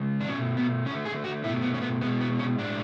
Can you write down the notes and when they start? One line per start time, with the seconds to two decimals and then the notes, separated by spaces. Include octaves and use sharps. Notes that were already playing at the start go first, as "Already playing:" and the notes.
Already playing: C#3 G#3
0.21 D4
0.29 B2 A3 C#4
0.57 B3
0.86 D3 C#4
0.90 A3
1.05 G#4
1.24 F#4
1.44 B2 A3 E4
1.62 B3
1.74 C#4
1.81 B3
2.01 G#3 B3
2.05 B2
2.21 B3
2.39 C#4
2.58 A2 G#3 D4